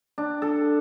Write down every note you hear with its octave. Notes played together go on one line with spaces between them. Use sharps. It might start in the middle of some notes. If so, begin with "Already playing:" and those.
D4
A4